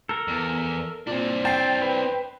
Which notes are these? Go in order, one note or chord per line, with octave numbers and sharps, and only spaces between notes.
A4 A#4
E2
A#2 C4 D4
G5 A5 C7
B4